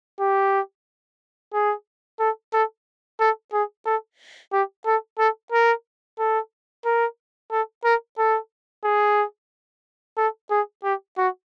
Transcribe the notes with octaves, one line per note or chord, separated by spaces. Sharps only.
G4
G#4
A4
A4
A4
G#4
A4
G4
A4
A4
A#4
A4
A#4
A4
A#4
A4
G#4
A4
G#4
G4
F#4